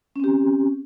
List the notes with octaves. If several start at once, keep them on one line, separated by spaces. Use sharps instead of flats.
C4 C#4 G4